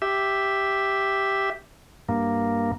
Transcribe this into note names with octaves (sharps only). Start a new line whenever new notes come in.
G4 E5
G2 A#3